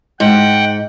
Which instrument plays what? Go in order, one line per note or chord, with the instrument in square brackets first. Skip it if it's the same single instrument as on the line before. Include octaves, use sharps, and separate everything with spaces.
[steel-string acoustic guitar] G#2 [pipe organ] F#5 G5